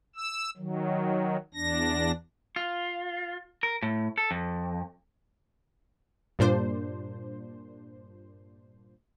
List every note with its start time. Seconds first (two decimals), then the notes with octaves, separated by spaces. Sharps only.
0.16 E6
0.57 D#3 F#3
1.54 E2 D4 A#6
2.56 F4
3.63 A#4
3.83 A2
4.18 A4
4.31 F2
6.39 G2 A#2 D4 C5